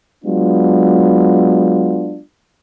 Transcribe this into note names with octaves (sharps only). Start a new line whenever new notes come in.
F#3 G#3 B3 D4 F4